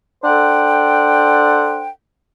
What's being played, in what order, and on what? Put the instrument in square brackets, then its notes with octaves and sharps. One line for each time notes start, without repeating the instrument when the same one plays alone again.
[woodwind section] D4 A4 C5 F#5 G5